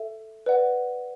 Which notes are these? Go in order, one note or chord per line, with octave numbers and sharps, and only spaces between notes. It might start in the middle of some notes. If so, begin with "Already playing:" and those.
Already playing: A4 E5
B4 D5 F#5